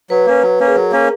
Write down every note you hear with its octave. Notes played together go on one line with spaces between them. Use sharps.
F#3 B4
A#3 C#4
F#3
A#3 C#4
G#4
F#3 A#4
A#3 C#4